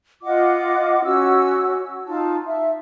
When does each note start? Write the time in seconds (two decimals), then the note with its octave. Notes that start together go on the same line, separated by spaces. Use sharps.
0.23 F4 D#5 F#5 D6
1.04 C#4 F#4 E6
2.07 D#4 F4 A5
2.46 E5